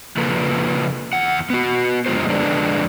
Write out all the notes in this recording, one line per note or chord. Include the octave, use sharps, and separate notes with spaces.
C#3 F3 A#3 F4 A4 B4
E2 F#5
B3 F#4
F#2 D3 G#3 F4 G4 C5
F2 D3 G#3 B3 D4